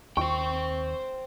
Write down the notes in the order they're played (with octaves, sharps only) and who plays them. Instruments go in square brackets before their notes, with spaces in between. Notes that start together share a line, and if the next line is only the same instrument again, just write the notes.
[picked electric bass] D#2 [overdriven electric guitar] C5 G5 [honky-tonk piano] C#6